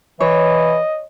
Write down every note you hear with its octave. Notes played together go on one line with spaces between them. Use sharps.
E3 C#5 D#5